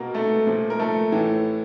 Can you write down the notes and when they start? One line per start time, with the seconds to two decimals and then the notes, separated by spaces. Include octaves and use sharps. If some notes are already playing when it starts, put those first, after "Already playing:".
Already playing: B2 A#3 A#4
0.14 A3 A4
0.47 A#2 F3
0.70 A#4
0.79 A3 A4
1.12 A2 E3